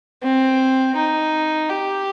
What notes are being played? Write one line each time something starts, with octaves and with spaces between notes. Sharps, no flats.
C4
D#4
G4